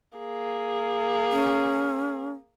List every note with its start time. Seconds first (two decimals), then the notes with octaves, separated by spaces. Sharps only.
0.18 A#3 G#4
1.32 C#4